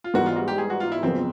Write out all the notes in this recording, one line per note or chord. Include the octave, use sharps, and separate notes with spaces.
F4
G#2 E3 G3 B3 F#4
F4
F#4
G4
G#4
F#4
F4
E4
F2 C#3 F#3 B3 C4